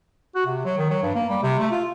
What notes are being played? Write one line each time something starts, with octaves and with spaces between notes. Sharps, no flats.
F#4
C3
F#3
D#3
F#3
G2
A#3
G3
C3
A3
F4